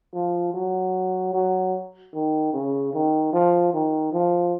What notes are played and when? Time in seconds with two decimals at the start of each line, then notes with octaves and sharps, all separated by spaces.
0.13 F3
0.54 F#3
1.34 F#3
2.14 D#3
2.53 C#3
2.93 D#3
3.33 F3
3.74 D#3
4.12 F3